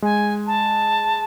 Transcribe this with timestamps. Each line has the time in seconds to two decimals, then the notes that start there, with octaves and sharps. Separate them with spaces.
0.02 G#3 G#5
0.47 A5